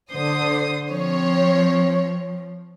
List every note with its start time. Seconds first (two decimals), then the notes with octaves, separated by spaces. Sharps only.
0.13 D3 C5 D#6
0.91 F3 C4 C#5